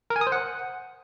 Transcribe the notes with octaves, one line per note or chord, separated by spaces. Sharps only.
A#4
G#5
D#6
C5
F#5